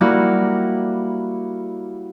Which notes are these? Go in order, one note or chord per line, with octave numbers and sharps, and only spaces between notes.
G3 A#3 E4 F#4